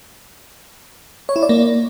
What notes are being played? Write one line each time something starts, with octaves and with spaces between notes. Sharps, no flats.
C#5
E4
D5
A#3